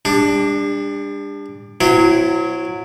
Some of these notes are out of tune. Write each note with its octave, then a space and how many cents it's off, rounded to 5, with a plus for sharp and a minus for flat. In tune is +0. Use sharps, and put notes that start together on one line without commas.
G3 +40 D4 +0
F#3 -15 C4 -30 E4 +15